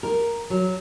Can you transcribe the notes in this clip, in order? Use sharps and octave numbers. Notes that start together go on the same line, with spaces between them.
A#4
F#3